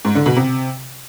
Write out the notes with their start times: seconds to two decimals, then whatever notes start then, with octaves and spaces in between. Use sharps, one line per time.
0.05 G#2
0.15 D3
0.26 B2
0.37 C3